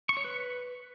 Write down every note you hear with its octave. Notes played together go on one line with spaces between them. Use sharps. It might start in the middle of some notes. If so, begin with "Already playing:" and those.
C#6
C#5
B4